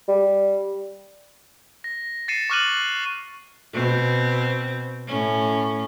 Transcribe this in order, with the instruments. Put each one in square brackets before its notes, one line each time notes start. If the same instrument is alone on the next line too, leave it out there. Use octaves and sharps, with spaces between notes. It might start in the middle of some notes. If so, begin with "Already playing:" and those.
[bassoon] G3
[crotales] A#6
A6 C7 C#7 D#7 E7
C#6 D6 F6 F#6 D#7 F#7
[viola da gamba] B2 C4
A2 C#4